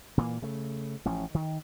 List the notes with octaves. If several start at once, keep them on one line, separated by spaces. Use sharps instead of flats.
A#2 E3 A#3
C#3 A3
A1 F3 C#4
D#3